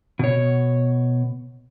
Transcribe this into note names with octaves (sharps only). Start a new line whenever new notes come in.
B2 C#5